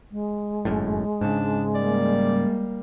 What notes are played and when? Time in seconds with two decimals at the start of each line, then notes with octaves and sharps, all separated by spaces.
0.12 G#3
0.65 G1 F#2 A2
1.21 G#2 C#3 D4
1.75 G3 A#3 D5